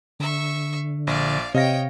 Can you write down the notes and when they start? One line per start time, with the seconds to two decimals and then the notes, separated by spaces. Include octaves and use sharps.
0.20 D3 E5 C#6
1.07 A#1 D5 F5
1.55 C3 C#5 D#5 F5 G5 A#6